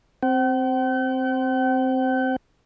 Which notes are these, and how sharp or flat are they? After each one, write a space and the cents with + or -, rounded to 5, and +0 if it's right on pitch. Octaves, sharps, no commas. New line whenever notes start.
C4 +0 G5 -45